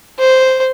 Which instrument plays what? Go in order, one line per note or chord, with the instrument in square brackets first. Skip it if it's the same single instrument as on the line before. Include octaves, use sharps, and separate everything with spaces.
[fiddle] C5